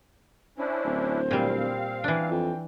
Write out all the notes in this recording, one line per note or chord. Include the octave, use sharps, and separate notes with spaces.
C#4 D4 E4 C5
D1
A#2 G3 C4 F5
E3 D4
F2 G5